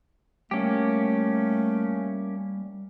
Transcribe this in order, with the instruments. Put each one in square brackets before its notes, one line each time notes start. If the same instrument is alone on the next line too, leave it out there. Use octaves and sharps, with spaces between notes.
[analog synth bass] G3 [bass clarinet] A3 [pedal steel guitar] A#3 C#4 G4